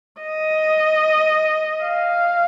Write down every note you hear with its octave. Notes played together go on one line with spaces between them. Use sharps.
D#5
F5